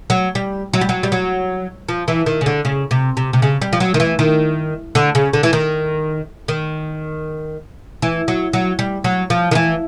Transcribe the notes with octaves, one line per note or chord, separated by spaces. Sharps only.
F#3
G3
F#3
G3
F#3
G3
F#3
F3
E3
D#3
C#3
D3
C#3
C3
C3
C3
C#3
G3
F3
F#3
D#3
E3
D#3
D3
C#3
D3
E3
D#3
D#3
E3
F#3
F#3
G3
F#3
F3
D#3
E3